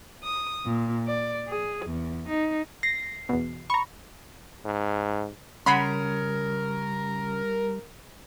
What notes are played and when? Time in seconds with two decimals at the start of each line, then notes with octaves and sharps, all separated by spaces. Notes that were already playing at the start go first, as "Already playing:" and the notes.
0.24 D#6
0.65 A#2
1.07 D5
1.47 G#4
1.85 E2
2.28 D#4
2.83 A#6 C7
3.29 E2 B2
3.70 A#5 B5 C#6
4.65 G#2
5.66 C#3 G3 C#4 A#4 F#5 B5 C6